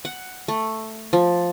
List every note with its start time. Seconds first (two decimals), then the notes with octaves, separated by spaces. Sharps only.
0.05 F#5
0.48 A3
1.13 F3